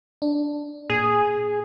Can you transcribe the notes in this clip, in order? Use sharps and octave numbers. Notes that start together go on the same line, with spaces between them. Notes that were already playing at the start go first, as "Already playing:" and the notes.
D4
A#2 G#4